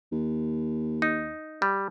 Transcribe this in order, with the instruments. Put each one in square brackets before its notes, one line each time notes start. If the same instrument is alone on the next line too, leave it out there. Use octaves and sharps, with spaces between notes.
[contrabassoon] D#2
[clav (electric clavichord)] D#4
G3